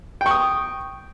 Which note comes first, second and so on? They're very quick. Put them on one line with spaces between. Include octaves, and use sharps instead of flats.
G5 C#6 D#6